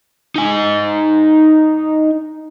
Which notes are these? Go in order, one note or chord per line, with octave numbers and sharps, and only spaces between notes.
D#4 G#5